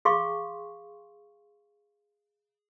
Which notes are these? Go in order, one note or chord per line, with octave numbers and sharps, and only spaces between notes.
G#4 F5 C6 C#6